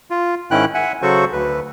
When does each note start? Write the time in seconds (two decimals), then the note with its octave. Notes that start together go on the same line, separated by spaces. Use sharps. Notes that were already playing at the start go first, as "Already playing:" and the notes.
0.10 F4
0.51 G#2 D#3 C#4 E4 G5 F#6
0.74 E5 F#5 G#5
1.02 C#3 F#3 F#4 A4 C5 C#6
1.33 D2 B4